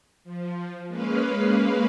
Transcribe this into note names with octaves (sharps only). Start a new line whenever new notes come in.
F3
G#3 A#3 C#4 B4 F5